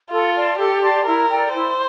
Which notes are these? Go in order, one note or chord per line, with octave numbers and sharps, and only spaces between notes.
F4 A4
D5 A5 C6
G4 A4
D5 A5 C6
E4 A#4
A4 D5 G5
E4 C5